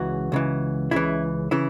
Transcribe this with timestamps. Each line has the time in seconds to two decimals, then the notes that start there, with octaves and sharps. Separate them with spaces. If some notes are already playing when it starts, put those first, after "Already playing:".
Already playing: C#2 C#3 E3 F#4
0.32 C#2 C#3 E3
0.91 C#2 C#3 E3 E4
1.51 C#3 E3 E4